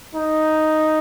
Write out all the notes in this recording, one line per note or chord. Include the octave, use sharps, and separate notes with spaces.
D#4